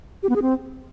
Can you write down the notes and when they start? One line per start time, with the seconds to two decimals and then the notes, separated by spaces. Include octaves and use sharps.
0.23 G4
0.29 B3
0.36 G#4
0.42 C4